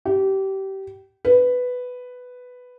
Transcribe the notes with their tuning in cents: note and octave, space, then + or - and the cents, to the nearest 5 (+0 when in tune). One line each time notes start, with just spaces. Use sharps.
G4 -25
B4 +5